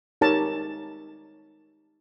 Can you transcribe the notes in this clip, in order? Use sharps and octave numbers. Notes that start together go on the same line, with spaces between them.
D#4 G4 A#4 C#5 A5